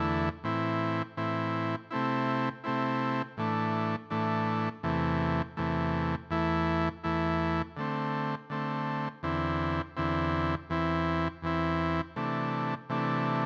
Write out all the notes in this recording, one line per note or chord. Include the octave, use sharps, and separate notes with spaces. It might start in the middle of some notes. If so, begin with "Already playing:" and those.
Already playing: E2 D3 A3 E4
A2 E3 C4 E4
A2 E3 C4 E4
C3 A3 C4 E4
C3 A3 C4 E4
A2 E3 A3 D4
A2 E3 A3 D4
E2 C3 E3 A3
E2 C3 E3 A3
E2 E3 A3 E4
E2 E3 A3 E4
D3 A3 C4
D3 A3 C4
E2 D3 C4 E4
E2 D3 C4 E4
E2 E3 C4 E4
E2 E3 C4 E4
C3 E3 A3 D4
C3 E3 A3 D4